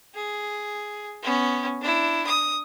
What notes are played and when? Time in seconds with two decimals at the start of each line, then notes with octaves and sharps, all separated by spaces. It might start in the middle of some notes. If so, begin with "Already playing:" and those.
0.15 G#4
1.22 B3 C#4
1.81 D4 E4
2.27 D#6